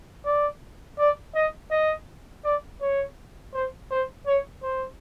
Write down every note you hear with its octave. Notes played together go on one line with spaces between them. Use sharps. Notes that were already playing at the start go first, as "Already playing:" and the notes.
D5
D5
D#5
D#5
D5
C#5
C5
C5
C#5
C5